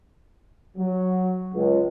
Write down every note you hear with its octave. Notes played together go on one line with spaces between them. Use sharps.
F#3
C#2